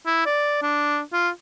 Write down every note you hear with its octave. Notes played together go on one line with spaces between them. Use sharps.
E4
D5
D4
F4